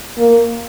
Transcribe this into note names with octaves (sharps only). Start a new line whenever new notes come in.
A#3